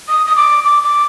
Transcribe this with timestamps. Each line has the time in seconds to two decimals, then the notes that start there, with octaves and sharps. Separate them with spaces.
0.09 D#6
0.26 D#6
0.36 D6
0.64 D6
0.83 D6